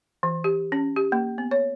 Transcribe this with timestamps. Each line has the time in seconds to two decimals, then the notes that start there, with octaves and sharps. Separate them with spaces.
0.23 E3
0.44 G4
0.72 C#4
0.96 G4
1.12 A#3
1.38 B3
1.51 C#5